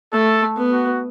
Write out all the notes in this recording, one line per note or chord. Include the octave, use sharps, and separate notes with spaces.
A3 A4
B3
F#4